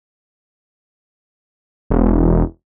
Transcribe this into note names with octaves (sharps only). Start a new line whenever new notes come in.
E1